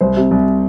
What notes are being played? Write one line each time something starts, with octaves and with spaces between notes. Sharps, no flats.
C2 C5
C3
C2